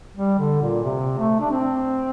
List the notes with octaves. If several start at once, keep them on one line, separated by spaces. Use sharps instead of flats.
G3
D3
A#2
C3
A3
D4
C4